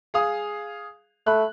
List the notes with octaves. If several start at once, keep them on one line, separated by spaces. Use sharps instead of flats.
G#4 F5 D#6
A3 B5 F#6